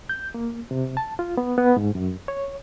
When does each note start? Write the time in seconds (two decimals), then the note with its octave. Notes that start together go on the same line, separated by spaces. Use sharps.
0.09 G6
0.34 A#3
0.71 C3
0.97 A5
1.19 F4
1.37 B3
1.58 B3
1.77 G#2
1.95 F#2
2.28 C#5